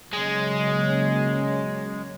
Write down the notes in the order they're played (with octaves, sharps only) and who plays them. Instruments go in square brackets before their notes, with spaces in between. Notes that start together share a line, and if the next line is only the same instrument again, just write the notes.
[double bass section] C#3 F#3 A#3 C#4 [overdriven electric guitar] G#3